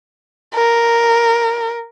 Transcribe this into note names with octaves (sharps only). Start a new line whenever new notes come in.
A#4